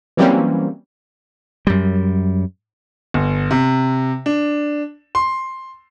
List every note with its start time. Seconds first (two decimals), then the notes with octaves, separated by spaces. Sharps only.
0.17 E3 F#3 G3 A#3 C4 C#4
1.67 F#2 G3
3.14 G1
3.51 C3
4.26 D4
5.15 C6